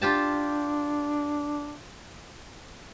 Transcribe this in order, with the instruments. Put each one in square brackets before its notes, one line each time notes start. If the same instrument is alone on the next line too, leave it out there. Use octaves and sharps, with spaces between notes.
[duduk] D4 [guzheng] F4 G4 A5